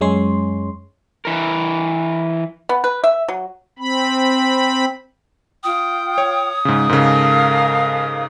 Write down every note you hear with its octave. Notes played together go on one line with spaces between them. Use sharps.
F#2 G#3 C#4 C#5 C6
E3 A#4
B3
B4
E5
F#3
C4 B5
F4 G5 D#6
C#5
G#2 C#3
G#2 C#3 A4 A#4 F5